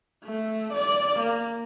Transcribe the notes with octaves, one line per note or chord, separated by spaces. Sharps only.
A3
D5
A#3